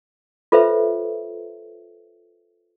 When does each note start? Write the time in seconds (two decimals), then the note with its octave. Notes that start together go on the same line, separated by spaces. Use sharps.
0.52 F4 A4 B4 C5 E5